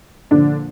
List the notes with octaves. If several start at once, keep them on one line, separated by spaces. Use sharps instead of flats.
A#2 D3 F3 D4